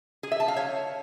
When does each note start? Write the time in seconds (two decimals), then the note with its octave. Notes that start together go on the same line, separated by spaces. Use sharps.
0.23 G#4
0.32 E5
0.40 A5
0.48 F5
0.56 C#5